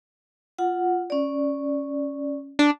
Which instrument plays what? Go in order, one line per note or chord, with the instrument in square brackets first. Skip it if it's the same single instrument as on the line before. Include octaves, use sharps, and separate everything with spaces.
[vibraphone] F4 F#5
C#4 D5
[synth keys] D4